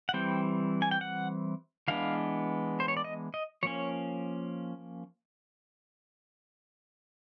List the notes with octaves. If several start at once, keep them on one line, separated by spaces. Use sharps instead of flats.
F#5
E3 G3 C4 G5
G#5
G5
F#5
E3 G#3 B3 D4 F5
C5
C#5
D5
D#5
D#5
F3 A#3 C#4 C#5